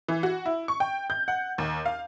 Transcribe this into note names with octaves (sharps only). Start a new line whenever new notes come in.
E3
F#4
E4
C#6
G5
G6
F#5
D#2
F5